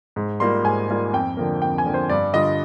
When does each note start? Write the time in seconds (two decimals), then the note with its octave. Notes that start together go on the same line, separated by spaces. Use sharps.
0.16 G#2
0.40 G3 A#3 F4 C6
0.64 G#2 G#5
0.89 G3 A#3 F4
1.13 F2 G5
1.37 D3 F3 A#3
1.62 F2 G5
1.78 G#5
1.86 D3 F3 A#3
1.94 C5
2.10 G2 D5
2.34 D3 G3 D4 F4 D#5